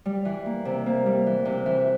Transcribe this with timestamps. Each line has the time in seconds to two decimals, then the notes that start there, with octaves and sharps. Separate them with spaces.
0.05 G3
0.25 E3
0.46 A#3
0.65 C3
0.86 A#3
1.06 G3
1.26 E3
1.45 C3
1.66 E3